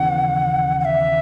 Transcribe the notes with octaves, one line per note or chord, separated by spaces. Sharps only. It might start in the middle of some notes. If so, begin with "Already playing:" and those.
Already playing: D#2 C#3 E3 B3 F#5
F#5
E5